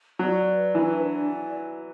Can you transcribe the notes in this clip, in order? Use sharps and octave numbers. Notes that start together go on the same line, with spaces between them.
F#3 D5
B4
E3 D4
D5